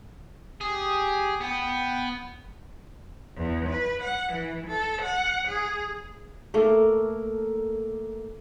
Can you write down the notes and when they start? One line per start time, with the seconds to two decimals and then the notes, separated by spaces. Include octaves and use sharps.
0.61 G4 G#4
1.41 B3 G5
3.37 E2
3.69 B4
4.02 F#5
4.31 E3
4.67 A4
5.02 F#5
5.47 G#4
6.54 A3 A#3 A4 A#4